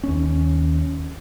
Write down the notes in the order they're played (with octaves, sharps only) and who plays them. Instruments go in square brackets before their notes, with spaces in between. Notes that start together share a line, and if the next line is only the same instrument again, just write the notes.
[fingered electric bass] D#2 C#4